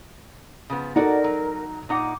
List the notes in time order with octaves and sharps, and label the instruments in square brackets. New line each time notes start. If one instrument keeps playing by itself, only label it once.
[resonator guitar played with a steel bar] C#3 F3 B3
[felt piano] D#4 A4 [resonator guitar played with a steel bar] F#4 D5 F#5 [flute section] A#4
[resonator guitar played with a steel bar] F#3
[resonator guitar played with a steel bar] A#2 D#4 F#5 [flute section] D6